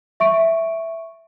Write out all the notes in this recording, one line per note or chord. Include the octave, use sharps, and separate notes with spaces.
E5 C#6 D7